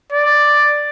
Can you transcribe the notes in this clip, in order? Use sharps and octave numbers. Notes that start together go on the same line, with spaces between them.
D5